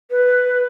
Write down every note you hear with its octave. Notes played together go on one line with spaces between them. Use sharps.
B4